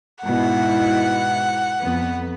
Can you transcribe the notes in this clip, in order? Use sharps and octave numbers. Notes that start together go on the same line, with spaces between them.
G#2 B2 E4 F#5
F2 B3